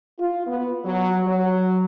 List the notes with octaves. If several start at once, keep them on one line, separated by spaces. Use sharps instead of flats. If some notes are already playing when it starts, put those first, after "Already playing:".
F4
B3
F#3
F#3